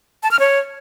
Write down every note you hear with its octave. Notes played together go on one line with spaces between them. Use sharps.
A5
F6
C#5